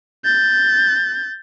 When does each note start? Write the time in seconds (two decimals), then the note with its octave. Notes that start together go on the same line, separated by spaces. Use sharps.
0.25 G6 A6